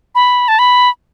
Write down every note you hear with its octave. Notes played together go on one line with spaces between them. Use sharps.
B5
A5
B5